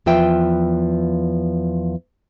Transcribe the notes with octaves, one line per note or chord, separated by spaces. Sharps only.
E2 F3 F4 B4 E5 G5